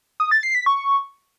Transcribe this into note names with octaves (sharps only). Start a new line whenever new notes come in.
D#6
A6
C7
B6
C#6